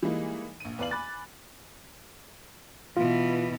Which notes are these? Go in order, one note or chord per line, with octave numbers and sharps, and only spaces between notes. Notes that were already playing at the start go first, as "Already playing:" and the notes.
E3 G3 G#3 A#3 D#4 E4
A#1 D#7
E2 B4 D5 F5 F#7
G#5 B5 D6 F#6 A6
B2 E3 F4